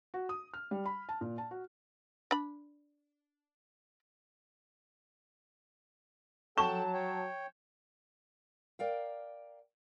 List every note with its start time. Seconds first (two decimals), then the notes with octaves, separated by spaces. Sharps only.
0.14 F#4
0.29 D#6
0.54 F6
0.71 G3
0.86 B5
1.09 A5
1.21 A#2
1.38 A5
1.51 F#4
2.31 D4 B5
6.58 F#3 A4 F#5 G5 A5 C#6 E7
6.94 C#5 G5
8.79 A#4 D5 F5 G5